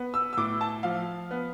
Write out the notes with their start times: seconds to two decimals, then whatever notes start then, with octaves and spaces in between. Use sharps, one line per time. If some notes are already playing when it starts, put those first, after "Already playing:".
Already playing: B3
0.14 E6
0.33 E6
0.37 A2 D6
0.61 A5
0.83 F3 F5
1.31 B3